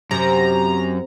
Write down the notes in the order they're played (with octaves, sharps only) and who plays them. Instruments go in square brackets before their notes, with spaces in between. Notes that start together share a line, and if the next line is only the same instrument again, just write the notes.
[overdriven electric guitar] F#2 [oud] C3 [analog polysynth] A#5